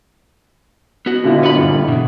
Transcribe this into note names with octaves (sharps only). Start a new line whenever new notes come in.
B3 F#4
A#2 D3 E4
B3 B5
G2
B2 E3